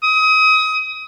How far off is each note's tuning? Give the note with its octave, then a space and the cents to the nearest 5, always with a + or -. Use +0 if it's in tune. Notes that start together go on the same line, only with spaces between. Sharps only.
D#6 +30